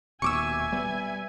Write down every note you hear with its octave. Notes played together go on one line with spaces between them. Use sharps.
D#1 D#2 B2 E5 G#5 C#6 D6 E6
G3 B3